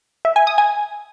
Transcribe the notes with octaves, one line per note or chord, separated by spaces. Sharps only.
E5
G#5
D#6
G#5